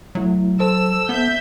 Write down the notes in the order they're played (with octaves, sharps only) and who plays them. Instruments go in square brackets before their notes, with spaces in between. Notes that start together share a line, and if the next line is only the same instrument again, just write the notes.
[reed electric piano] C2 A3 E4 [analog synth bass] F#3
[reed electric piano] A4 C5 A5 [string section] E6
[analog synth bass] B3 [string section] E5 G6